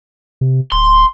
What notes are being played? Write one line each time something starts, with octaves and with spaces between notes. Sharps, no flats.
C3
D1 C6